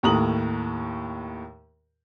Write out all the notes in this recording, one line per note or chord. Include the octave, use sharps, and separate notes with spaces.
D#2 A2 A#5 D#6 F#7